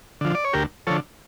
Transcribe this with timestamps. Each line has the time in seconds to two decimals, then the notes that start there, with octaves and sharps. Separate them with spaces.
0.21 D3 F3
0.35 D5
0.45 C#5
0.53 D2 G4 A#4
0.87 D3 F3 A4 C#5